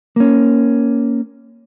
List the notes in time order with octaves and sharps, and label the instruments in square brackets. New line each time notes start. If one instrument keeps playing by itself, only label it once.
[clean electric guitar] A#3 C#4